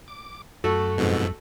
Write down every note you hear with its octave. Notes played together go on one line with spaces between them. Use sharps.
D6
F#2 A3 F#4 A4
F2 G#2 B2